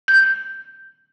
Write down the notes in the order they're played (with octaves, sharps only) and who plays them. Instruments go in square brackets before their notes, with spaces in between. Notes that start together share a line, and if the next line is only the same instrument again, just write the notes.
[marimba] G6